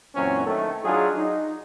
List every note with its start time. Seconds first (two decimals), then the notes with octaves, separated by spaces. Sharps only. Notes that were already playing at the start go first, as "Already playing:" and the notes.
0.15 F#2 A#2 E3 F#3 C4 C#4
0.46 D#3 A3
0.85 F#3 D4 D#4 F4 G#4
1.17 D#4